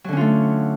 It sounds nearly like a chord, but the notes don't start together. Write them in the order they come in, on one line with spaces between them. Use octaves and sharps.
F#3 D3 C#4 F4 A3